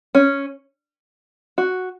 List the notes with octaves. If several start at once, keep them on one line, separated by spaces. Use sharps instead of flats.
C#4
F#4